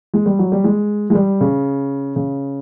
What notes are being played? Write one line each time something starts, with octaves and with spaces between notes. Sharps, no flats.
G#3
G3
F#3
G3
G#3
G#3
G3
C#3
C#3